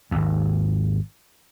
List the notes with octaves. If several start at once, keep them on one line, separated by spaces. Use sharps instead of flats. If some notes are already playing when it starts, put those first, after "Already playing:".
G#1 D#2